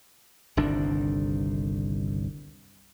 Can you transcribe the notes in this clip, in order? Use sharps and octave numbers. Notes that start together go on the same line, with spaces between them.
G1 C2 D#3 D4